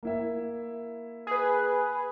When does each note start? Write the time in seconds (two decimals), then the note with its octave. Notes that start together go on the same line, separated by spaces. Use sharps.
0.03 A#3 E4 E5
1.27 G#4 B4